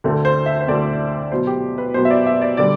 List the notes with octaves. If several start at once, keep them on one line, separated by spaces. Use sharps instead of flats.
D2 D3 A3 C4
C5
E5
C5
D2 D3 A3 C4 D5
B2 F#3 B3 C5
G4
B4
B2 F#3 B3 C5
E5
D5
E5
D5
D3 G3 D5